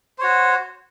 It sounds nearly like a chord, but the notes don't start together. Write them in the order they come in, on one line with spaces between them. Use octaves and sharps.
C5 C#5 F#4